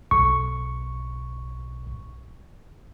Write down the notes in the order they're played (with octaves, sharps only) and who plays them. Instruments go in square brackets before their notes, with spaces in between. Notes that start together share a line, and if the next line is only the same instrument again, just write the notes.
[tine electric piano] B1 C#6